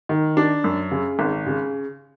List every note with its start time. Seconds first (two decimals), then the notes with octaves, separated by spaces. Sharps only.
0.09 D#3
0.37 D4
0.64 F#2
0.91 C#3
1.19 G#1
1.47 C#3